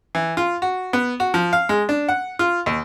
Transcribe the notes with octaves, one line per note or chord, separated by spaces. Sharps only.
E3
F4
F#4
B3
F#4
F3
F5
G#3
D4
F#5
F4
D#2